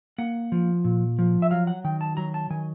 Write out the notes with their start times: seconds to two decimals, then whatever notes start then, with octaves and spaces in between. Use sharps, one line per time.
0.18 A#3 F#5
0.52 F3
0.84 A#2
1.19 F3
1.42 E5
1.51 F#3 F5
1.67 F#5
1.84 D#3 G5
2.01 A5
2.17 F#3 A#5
2.34 A5
2.50 D#3 G#5